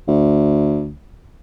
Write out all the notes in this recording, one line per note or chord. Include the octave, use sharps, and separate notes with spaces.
D2